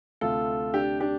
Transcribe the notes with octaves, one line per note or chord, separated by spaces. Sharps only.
D2 C3 A3 F4 A4
D4 G4
D4 G4